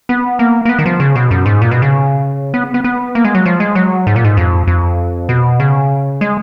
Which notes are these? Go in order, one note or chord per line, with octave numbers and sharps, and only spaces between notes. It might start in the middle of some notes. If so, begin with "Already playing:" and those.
B3
A#3
A#3
B3
D#3
F3
C#3
B2
F#2
G#2
A#2
B2
C#3
B3
B3
B3
A#3
G#3
F#3
F3
G#3
F#3
G#2
A#2
G#2
F2
F2
B2
C#3
G#3